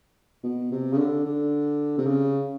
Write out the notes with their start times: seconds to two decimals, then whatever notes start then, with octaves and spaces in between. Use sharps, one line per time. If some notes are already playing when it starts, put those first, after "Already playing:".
0.44 B2
0.72 C3
0.92 C#3
0.98 D3
1.25 D3
1.98 C3
2.06 C#3